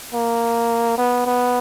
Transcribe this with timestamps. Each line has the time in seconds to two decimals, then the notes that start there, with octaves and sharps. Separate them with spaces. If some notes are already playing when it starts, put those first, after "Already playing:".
0.13 A#3
0.98 B3
1.26 B3